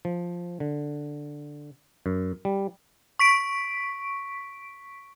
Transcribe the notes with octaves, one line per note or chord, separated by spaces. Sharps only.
F3
D3
F#2
G3
C#6 B6 D7